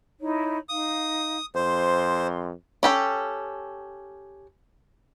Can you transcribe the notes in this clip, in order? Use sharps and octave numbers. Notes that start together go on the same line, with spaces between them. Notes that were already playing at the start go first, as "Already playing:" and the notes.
D#4 E4 C#5
D#4 F5 D#6
F2 C5 C6
C#4 G4 A4